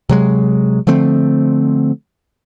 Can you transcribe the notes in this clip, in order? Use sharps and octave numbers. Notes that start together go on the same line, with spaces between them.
C3 F#3 G#3
D3 F3 A3 C4